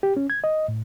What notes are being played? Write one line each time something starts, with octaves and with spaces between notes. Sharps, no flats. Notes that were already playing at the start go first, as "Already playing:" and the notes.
G4
C#4
G#6
D#5
A2